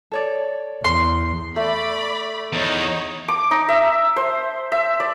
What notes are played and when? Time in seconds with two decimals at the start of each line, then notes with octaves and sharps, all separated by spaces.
0.12 A4 C#5 D5
0.84 E2 C6
1.56 A3 D5 B5
2.53 E2 D#4 C#5
3.28 D6
3.51 D#4
3.69 E5
4.16 C5
4.72 E5
5.00 D5